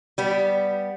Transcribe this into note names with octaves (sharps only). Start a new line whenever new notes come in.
G3 B3